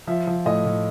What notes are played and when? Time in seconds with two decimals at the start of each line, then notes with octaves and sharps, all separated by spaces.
0.07 F3 E5
0.27 F3
0.46 A2 D#5
0.65 A2